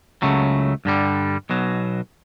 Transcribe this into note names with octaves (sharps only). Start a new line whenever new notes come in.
C#2 C#3 F#3 A3
G2 D3 G3
B1 B2 F#3